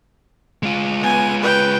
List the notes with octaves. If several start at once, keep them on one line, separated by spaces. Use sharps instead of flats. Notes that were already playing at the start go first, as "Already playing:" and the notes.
G#3 F4
B3 G#5
B4 G5